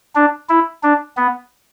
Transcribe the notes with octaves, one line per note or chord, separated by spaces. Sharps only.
D4
E4
D4
B3